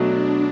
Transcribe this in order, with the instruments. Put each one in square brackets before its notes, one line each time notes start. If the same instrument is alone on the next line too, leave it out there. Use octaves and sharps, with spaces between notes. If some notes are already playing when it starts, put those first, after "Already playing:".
Already playing: [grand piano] B2 F#3 A3 [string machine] D4